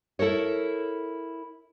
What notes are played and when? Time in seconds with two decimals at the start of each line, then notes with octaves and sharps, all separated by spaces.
0.19 E4 A4 A#4 C#5